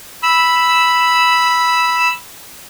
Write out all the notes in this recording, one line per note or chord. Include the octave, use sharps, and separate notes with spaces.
B5 E6